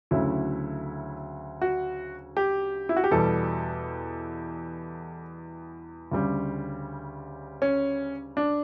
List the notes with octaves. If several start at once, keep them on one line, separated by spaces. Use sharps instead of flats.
D2 C#3 F#3 A3 E4
F#4
G4
E4
F#4
G4
E2 B2 G3 A4
D2 C#3 G3
C#4
D4